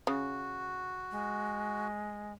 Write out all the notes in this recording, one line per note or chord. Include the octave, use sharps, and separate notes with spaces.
C#3 F#4
G#3